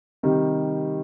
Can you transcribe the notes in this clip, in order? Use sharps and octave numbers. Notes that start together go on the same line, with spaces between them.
C3 D#3 G3